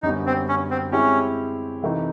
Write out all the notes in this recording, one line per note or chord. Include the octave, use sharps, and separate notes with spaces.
F#2 D3 G3 B3 D#4
C4
C#4
C4
G#3 C4 C#4 E4 G4
C3 E3 A3 C4 D#4